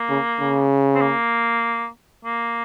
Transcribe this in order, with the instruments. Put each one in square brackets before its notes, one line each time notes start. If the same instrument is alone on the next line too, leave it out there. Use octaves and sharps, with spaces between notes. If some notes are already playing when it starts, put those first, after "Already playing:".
Already playing: [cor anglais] A#3
[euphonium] C#3
C#3
[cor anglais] C4
A#3
A#3